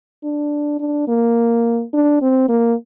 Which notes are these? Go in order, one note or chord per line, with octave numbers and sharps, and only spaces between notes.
D4
D4
A#3
D4
C4
A#3